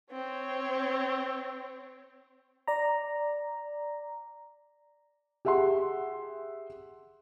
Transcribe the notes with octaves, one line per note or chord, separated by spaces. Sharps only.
C4 C#5
D5 A#5
G4 G#4 E5 F#5 C6